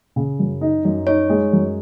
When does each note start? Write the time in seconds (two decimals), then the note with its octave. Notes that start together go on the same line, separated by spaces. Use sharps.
0.16 C#3
0.39 F#2
0.61 D#4
0.85 F#2
1.07 D#4 C#5
1.29 G#3
1.53 F#2